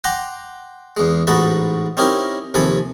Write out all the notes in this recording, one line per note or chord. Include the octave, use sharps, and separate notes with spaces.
F#5 G5 A#5 C6 D6
E2 G#3
A1 G#2 D#4 F#4 A5 B5
C4 C#4 D#4 E4 G4 A#4
D#2 C3 F3 A4 G#5 B5